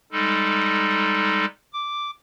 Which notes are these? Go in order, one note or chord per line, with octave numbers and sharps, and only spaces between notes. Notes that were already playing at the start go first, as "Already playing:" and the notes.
G3 G#3 D#4 A4
D6